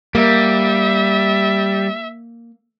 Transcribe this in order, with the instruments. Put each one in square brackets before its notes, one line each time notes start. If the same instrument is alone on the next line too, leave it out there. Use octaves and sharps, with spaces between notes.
[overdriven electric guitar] G3 [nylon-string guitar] A#3 [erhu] E5